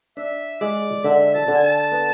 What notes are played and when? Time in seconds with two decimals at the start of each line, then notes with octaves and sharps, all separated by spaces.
0.17 D4 E5
0.61 G#3 D5
1.04 D3 E5
1.34 A5
1.48 D3
1.55 G#5
1.63 A5
1.92 B3